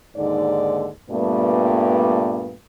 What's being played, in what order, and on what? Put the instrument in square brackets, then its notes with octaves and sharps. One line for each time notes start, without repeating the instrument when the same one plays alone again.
[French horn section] D#2 G#2 D3 D5
G2 A#2 G3 A3 B3